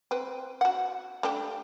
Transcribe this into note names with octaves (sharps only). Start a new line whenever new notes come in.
C4 B4
F#4 F#5
A3 D4 G4